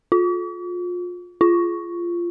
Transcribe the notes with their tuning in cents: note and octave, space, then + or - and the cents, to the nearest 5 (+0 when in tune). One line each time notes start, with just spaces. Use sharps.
F4 +30
F4 -15